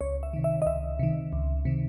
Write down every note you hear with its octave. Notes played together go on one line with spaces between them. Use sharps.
C#2 C#5
E5
C3 D#3
E5
D#5
C#2 E5
C3 D#3
C#2
C3 D#3